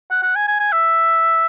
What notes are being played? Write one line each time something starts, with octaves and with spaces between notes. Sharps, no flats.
F#5
F#5
G#5
G#5
G#5
E5